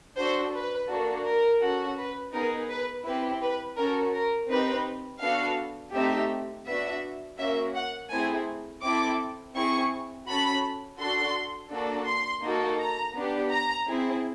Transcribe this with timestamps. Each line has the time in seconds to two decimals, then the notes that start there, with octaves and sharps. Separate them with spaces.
0.17 D4 F#4 A4 C5
0.52 B4
0.88 A#3 D4 F#4 A4
1.25 A#4
1.61 C#4 F#4 A4
1.96 B4
2.33 B3 D#4 G#4 A#4
2.70 B4
3.05 C4 E4 G4 B4
3.42 B4
3.77 C#4 F#4 A4 A#4
4.13 A#4
4.49 C4 D#4 G4 B4
5.21 B3 D4 F#4 A4 F5
5.93 A3 C4 D#4 G4 E5
6.66 B3 D4 F#4 E5
7.38 A#3 C#4 F#4 E5
7.74 F#5
8.10 A3 C4 E4 G#4 G#5
8.82 C4 E4 A4 D6
9.54 C4 E4 G#4 C#6
10.26 C#4 F#4 A4 B5
10.98 D4 F#4 A4 C6
11.70 A#3 D4 F#4 A4
12.06 C6
12.42 A#3 D#4 F#4 A4
12.79 A#5
13.15 B3 D4 G4
13.50 A#5
13.86 C4 E4 G#4